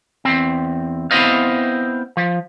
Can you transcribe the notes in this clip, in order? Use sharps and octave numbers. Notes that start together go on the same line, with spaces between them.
E2 C4
B3 C4 E4 C5 D#5 F5
F3